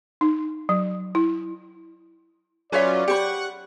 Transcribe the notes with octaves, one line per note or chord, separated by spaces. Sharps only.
D#4
F#3
E4
F#3 C#4 F4 B4 C#5 D5 E5
G4 C5 F#5 B5 C#6